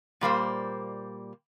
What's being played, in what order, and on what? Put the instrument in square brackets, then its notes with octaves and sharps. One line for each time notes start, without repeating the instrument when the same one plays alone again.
[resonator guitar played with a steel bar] A#2 G3 A#3 C5